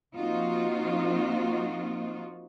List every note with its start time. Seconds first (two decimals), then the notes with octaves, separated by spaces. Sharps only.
0.15 F3 A#3 C4 D#4 F4 F#4